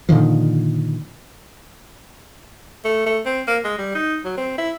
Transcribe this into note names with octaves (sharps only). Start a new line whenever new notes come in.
A#2 D3 D#3 F3
A3
A3
C4
A#3
G#3
G3
D#4
F#3
C4
E4